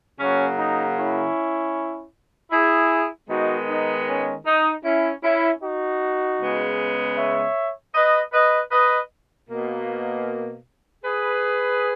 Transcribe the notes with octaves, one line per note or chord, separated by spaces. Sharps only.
C#3 F#3 A#3 C#4
D#4
C#4 E4
E4 G#4
D#3 G#3 B3 D#4 F#4
D#4
C#4
D#4
C#4 E4
C#4 E4
D#4 F#4
C#3 G#3 B3
C#5 E5
B4 D#5
B4 D#5
B4 D#5
B2 A#3
G#4 B4